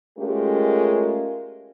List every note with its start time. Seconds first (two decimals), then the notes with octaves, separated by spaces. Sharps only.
0.17 G#3 A3 C#4 F4 G4 A#4